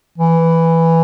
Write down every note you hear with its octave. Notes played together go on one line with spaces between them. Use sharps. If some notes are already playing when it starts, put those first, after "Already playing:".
E3